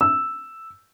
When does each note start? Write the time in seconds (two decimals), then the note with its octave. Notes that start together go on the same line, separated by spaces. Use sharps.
0.01 E6